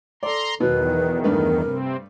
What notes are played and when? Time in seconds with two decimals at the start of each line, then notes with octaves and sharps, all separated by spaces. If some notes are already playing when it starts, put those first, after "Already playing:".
0.23 A4 D5 A#5 C6
0.60 E2 B2 D#3 F#3 B4
1.24 G2 A3 A#4 B4
1.62 C3 C4